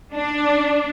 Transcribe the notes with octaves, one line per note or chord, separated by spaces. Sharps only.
D4